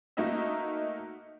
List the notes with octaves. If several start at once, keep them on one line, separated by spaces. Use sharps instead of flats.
A3 A#3 D#4 F#4 D#5 E5